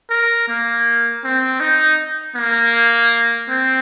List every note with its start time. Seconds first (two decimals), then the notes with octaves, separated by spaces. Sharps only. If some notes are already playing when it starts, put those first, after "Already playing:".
0.10 A#4
0.48 A#3
1.24 C4
1.60 D#4
2.36 A#3
3.50 C4